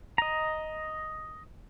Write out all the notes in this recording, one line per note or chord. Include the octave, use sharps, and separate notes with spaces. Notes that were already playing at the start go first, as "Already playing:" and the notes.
D#5 A#5